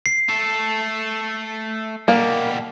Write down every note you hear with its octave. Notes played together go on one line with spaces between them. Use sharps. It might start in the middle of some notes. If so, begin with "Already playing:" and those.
C7
A3 A4
B2 G3 A#3